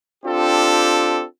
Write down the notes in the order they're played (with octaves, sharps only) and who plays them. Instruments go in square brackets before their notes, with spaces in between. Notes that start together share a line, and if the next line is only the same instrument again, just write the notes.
[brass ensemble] C4 D4 F4 G4 A4